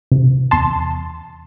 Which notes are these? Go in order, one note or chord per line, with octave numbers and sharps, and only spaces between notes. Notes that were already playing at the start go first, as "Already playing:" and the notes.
C3
E2 A5 C6